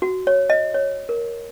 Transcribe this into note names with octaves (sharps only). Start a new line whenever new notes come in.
F#4
C#5
D#5
C#5
A#4